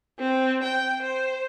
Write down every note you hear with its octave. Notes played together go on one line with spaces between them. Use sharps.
C4
G5
C5